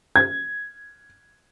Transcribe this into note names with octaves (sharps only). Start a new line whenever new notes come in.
G#6